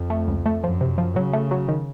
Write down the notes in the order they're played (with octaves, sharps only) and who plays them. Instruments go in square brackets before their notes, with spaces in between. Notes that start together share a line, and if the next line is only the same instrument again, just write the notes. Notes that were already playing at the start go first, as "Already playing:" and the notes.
Already playing: [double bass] F2
[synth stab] A3
C#2
A3
[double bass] F#2 [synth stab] F3
[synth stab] C3
F3
[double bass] C#3 [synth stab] F#3
[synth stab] A3
F#3
D#3